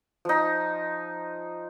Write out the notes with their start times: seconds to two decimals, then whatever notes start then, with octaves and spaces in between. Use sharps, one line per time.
0.25 F3 D#4